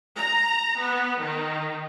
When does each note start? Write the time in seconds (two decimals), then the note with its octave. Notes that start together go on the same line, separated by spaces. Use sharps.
0.17 A#5
0.80 B3
1.21 D#3